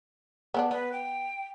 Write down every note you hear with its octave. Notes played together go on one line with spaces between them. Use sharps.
B3 C4 D4
B3 B4
G5